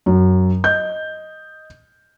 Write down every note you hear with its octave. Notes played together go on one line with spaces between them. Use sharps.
F#2
D#5 G6